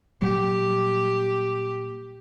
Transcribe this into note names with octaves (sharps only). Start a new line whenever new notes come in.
A#2 F#3 G3 G4